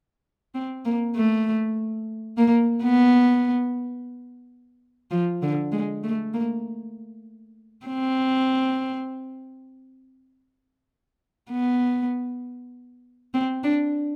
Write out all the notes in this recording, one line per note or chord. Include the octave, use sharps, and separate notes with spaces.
C4
A#3
A3
A#3
B3
F3
D3
G#3
A3
A#3
C4
B3
C4
D4